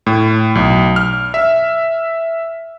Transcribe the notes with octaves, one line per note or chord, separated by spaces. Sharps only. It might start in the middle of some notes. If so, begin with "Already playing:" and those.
A2
B1
F6
E5